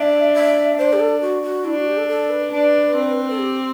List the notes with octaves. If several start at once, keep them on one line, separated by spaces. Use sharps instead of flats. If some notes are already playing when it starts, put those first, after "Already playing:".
Already playing: D4 E5
E5
D4 C5
G4
A4
F#4
F#4
D4 E4
F#4
G4
A4
A4
B4
D4
C4
A4
G4